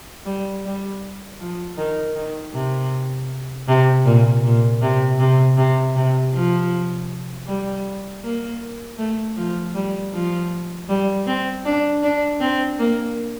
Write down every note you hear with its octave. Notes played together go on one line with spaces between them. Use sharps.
G3
G3
F3
D#3
D#3
C3
C3
A#2
A#2
C3
C3
C3
C3
F3
G3
A#3
A3
F3
G3
F3
G3
C4
D4
D4
C4
A#3